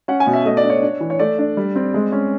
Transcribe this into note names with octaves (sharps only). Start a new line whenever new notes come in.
C#4 F#5
G#5
B2
E5
A3 D#5
D5
D4
C#5
D4
E3
C#5
A3 D5
D4
G3
C4
G#3
C#4